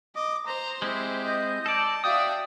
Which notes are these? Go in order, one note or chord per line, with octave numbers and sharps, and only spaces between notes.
D#5 D6
C5 A#5
G#3 C4 E4 G4
D#5 D#6 G6
A4 D5 A5
F#4 D5 E5 F5 G5 D#6